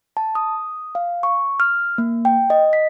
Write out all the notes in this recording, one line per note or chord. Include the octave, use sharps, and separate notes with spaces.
A5
D#6
F5
C#6
F6
A#3
G5
D#5
B6